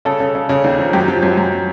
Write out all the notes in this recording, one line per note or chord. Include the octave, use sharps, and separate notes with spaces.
C#3 A4
C#3
C#3
C#3
D#2
F3
F#2 G4
F3
F#2
F#2